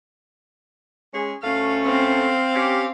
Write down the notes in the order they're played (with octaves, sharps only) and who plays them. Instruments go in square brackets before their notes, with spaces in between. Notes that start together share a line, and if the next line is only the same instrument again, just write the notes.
[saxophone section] G#3 C#4 G#4
[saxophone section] D2 A3 C#4 [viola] F5
[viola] C4 F5
[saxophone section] C#4 G4